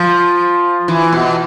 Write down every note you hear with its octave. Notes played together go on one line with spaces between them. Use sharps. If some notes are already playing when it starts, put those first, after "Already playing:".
Already playing: F3
E3
B2